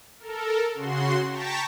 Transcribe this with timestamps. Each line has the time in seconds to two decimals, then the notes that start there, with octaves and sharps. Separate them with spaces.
0.19 A4 A#4
0.75 C#3 F#4 C6
1.30 G5 A5 A#5 C#6 A6 B6